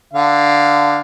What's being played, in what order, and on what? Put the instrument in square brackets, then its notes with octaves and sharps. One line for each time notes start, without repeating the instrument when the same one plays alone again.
[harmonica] D3 F5